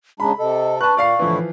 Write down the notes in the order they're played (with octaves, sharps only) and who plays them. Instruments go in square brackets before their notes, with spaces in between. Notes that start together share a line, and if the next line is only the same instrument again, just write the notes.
[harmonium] C#3 G#3 D4 [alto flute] A#5 [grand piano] B5
[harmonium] C3 A4 [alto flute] D#5
[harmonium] D4 B4 [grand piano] A5 F#6 [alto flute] C#6
[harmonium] A#2 [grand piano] D5 F5 C7
[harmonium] A2 D3 E4 [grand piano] E3 F3